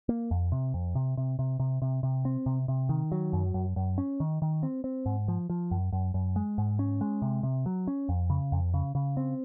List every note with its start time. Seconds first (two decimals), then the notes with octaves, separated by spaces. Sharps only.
0.09 A#3
0.31 F2
0.52 C3
0.74 F2
0.95 C3
1.17 C3
1.39 C3
1.60 C3
1.82 C3
2.03 C3
2.25 C4
2.46 C3
2.68 C3
2.89 D#3
3.12 F#3
3.33 F#2
3.54 F#2
3.76 F#2
3.98 C#4
4.20 D#3
4.42 D#3
4.63 C4
4.84 C4
5.06 G#2
5.28 F3
5.50 F3
5.71 F#2
5.92 F#2
6.14 F#2
6.36 G#3
6.58 G#2
6.79 C#4
7.01 G#3
7.22 C3
7.43 C3
7.66 F#3
7.88 C#4
8.09 F2
8.30 C#3
8.52 F2
8.74 C#3
8.95 C#3
9.17 C4